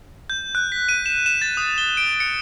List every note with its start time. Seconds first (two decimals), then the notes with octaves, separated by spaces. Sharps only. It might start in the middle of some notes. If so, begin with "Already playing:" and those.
0.30 G6
0.55 F#6
0.72 B6
0.89 D#7
1.06 E7
1.26 E7
1.42 A6
1.57 D#6
1.78 G7
1.97 D7
2.20 C#7